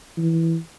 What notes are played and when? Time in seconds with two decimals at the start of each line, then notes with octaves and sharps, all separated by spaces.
0.18 E3